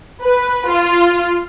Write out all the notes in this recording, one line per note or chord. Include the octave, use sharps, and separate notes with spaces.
B4
F4